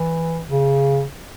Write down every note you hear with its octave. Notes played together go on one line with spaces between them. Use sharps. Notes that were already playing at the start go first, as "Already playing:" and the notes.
Already playing: E3
C#3